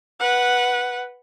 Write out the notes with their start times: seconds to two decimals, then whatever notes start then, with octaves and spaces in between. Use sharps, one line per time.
0.19 B4 F#5